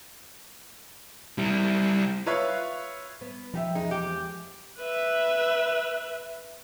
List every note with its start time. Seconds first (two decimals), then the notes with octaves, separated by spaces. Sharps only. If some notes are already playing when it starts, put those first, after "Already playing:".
1.38 G3 E4
2.26 F4 B4 C#5 E5 F5
3.21 B3
3.54 F3 D#4 G4 E5
3.75 E2 G#3 D#4
3.91 G4
4.79 B4 E5